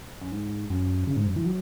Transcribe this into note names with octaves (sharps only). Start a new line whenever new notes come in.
F#2
G#2
F#2
C#3
G#2
F#2
E3
F#3